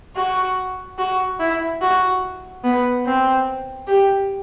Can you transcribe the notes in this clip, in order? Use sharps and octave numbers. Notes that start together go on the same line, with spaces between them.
F#4
F#4
E4
F#4
B3
C4
G4